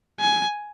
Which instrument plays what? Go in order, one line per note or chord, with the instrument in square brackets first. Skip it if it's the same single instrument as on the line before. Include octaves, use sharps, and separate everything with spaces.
[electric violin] G#5